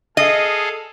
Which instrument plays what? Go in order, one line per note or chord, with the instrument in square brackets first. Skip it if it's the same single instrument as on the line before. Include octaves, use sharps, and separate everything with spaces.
[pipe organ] G#4 A4 F5 [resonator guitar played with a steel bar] D#5